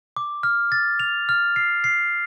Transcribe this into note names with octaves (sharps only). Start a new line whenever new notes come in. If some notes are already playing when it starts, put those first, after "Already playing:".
D6
F6
A6
F7
F6
C7
C7